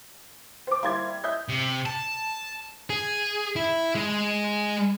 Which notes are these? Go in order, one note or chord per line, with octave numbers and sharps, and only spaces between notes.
C5 D6
G3 A#3 E4 C5 G#6
D#5 E5 G6
C3
A5
G#4
E4
G#3